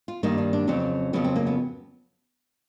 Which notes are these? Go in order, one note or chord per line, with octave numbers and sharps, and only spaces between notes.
F4
G2 D#3 G3 A#3 D#4
D4
D4
F2 C#3 F#3 C4
F2 C#3 F#3 B3
C4
A#3
B3